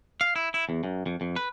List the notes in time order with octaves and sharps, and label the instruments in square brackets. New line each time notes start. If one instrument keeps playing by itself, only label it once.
[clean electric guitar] F5
E4
E4
E2
F#2
F2
F2
B4